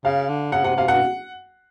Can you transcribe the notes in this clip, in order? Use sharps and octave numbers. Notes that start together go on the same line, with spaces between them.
C#3 F5
D3
C#3 F#5
C3 F#5
C3 F5
B2 F#5